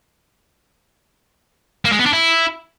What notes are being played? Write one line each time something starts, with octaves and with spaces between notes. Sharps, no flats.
A#3
G#3
B3
D4
E4